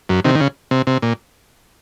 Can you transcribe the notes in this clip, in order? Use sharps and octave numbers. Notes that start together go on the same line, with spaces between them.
F#2
C3 D#3
D#3
C#3
C3
C3
A#2